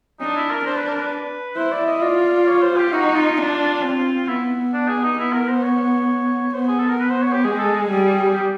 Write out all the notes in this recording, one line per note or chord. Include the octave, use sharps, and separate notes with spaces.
D4 D#4
E4
A#4
D4 C5
B4
A#4
B4
E4 C5
D5
D#5
F4 D5
C#5
C5
G4
D#4 F#4
F4
D4
C4
B3 E4
D4
G#4
D#4
B3 E4
A#4
C5
C#5
B3 C5
G#4
A4
A#4
B4
C5
C#5
G4
G#3 G#4
A4
G#4
G3
G4